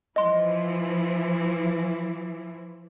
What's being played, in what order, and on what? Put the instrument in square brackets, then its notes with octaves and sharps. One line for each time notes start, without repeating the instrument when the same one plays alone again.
[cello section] E3 F3 E4 [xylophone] D#5 C6